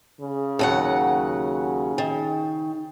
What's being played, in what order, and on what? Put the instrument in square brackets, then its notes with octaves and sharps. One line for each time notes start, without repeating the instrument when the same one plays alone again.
[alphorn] C#3
[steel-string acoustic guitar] D#2 F#3 F#5
D#3